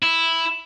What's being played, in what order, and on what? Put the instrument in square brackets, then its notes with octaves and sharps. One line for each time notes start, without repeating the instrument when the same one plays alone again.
[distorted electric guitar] E4